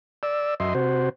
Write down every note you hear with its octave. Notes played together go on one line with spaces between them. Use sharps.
D5 E6
F#2 D#5 E5 C6
C3 F#4 C5